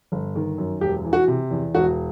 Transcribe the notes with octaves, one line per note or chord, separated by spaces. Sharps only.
G1
D#3
F#2
E1 G4
E3
F#4
C3
E2
E1 F#4